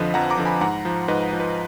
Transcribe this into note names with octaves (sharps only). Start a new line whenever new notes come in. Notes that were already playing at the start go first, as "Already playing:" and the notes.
Already playing: F2 D3 F3 B4 D#5
F2 F#5 A#5
A#5 D6
D3 F3
G#5 B5
G#2 F#5 A#5
F3
G#2 B4 D#5
F3
B4